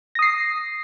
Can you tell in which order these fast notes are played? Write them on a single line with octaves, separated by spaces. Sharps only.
A#6 D#6 C7